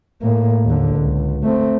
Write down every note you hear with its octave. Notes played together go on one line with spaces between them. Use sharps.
A2 A#3
D#2 D3
C#2
A3 C4